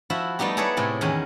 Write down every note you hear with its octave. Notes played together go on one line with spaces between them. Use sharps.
F3 E4 F#4 E5
G3 A3 B3 D#4 G4
E4 G#4 A4 B4 C#5 D5
A2 C3 G#4
E2 D#3 C#4 G#5